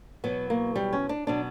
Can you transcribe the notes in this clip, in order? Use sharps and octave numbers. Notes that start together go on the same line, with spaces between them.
E2 B2 F#3 B3
A#3
G3
C#4
D4
B2 F#3 D4